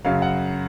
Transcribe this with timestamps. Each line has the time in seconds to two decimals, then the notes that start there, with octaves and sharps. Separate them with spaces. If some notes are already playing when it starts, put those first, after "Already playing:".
0.05 F#2 C#3 F#3 F5
0.22 F#5